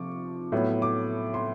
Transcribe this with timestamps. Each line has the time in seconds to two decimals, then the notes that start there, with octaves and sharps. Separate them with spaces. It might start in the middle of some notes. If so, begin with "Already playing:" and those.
Already playing: C3 F3 C#6 D6
0.52 A2 F#3 B3
0.82 D6
1.34 C6